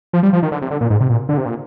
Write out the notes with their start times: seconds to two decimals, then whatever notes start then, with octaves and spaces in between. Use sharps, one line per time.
0.13 F3
0.23 G3
0.33 F3
0.43 D#3
0.52 D3
0.62 C3
0.71 D3
0.81 A#2
0.90 G#2
1.00 C3
1.10 A#2
1.29 D3
1.38 C3
1.46 A#2